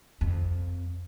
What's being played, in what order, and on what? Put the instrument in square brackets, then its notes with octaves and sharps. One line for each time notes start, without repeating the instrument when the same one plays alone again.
[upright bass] F2